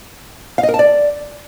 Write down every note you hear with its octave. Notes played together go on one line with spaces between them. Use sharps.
F5
D#5
A#4
A5
D5